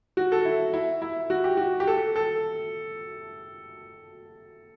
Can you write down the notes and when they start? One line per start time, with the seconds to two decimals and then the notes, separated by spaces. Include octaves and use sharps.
0.17 F#4
0.32 A4
0.45 E4
0.73 E4
1.02 E4
1.30 F#4
1.44 G4
1.57 F#4
1.80 G4
1.87 A4
2.16 A4